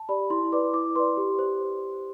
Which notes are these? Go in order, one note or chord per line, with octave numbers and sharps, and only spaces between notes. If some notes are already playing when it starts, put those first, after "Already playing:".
Already playing: A5
G4 D5 B5
E4 C6
B4 D5 D6
E4 D6
B4 D5 C6
G4
C5